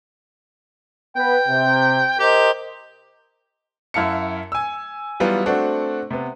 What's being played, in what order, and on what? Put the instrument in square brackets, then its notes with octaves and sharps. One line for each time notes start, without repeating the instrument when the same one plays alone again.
[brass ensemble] B3 B4 [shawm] G5
[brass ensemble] C3
[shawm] G4 [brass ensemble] A#4 C5 D#5
[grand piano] F#2 E4 F5 A5 C#7
G#5 E6
E3 F#3 G3 B3 F4
A3 C4 D4 F#4
C3 B3